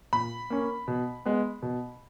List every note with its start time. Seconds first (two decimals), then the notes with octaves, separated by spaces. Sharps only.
0.13 A#2 B5
0.50 A#3 C#4
0.88 B2
1.25 G#3 B3
1.62 B2